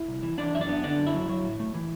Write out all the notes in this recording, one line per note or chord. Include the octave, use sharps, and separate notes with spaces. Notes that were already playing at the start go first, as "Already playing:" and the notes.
Already playing: E4
C2
E3
E3 D4 D5
F#2 E5
D4 D5
B3
D3 D4 D5
F#2
E4 E5
F#3
F#3
A2
A3
E3